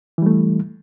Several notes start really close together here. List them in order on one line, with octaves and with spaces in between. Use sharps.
E3 G3 A3